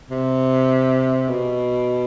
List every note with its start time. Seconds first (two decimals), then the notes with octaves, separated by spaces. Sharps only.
0.10 C3
1.28 B2